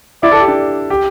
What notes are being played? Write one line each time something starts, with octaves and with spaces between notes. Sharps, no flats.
E4 D5
A4
G4
D4
G4